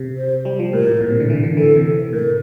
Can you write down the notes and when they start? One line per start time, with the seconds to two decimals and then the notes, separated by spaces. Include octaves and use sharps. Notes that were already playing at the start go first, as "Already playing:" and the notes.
Already playing: C3
0.17 C5
0.45 G3
0.60 F3
0.73 A2 A#4
0.87 A2
1.01 A#2
1.11 C3
1.20 D3
1.30 E3
1.44 D3
1.57 E3 A4
1.66 D3
1.76 C3
2.13 A2 A#4